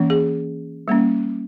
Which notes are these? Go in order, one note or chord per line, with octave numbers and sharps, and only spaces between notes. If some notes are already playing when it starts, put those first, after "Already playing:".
Already playing: E3 A#3 C#4
G#4
G3 A#3 C#4